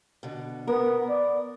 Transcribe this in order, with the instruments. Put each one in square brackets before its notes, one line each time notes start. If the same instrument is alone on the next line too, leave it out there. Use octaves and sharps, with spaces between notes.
[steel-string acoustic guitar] B2 D3
[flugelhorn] B3 [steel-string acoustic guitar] A#4
[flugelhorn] D5